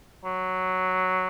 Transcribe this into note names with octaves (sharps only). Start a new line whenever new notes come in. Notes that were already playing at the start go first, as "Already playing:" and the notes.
F#3